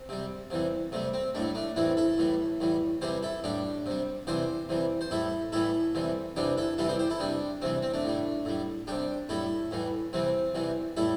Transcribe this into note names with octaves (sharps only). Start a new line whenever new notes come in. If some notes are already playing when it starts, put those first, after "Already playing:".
Already playing: C4
C3 G3
C3 E3 G3
C3 G3 A3
C4
A2 G3 A3 D4
A3 D4
A2 E3 G3 C4 E4
E4 A4
A2 E3 G3
A2 E3 G3
C3 E3 G3 G4 C5
E4 A4
A2 G3 D4 G4
C3 G3
C3 E3 G3 G4 C5
C3 E3 G3
C5
A2 G3 E4 A4
A2 E3 G3 E4 A4
C3 E3 G3
C3 E3 G3 D4 G4
E4 A4
C3 E3 G3 E4 A4
G4 C5
G4 C5
E4 A4
C3 G3 D4 G4
C3 E3 G3 C4
C4
A3 D4
A2 G3
A2 G3
C3 G3 D4 G4
A2 G3 E4 A4
A2 E3 G3
C3 E3 G3 C4
C3 E3 G3
A2 G3 E4 A4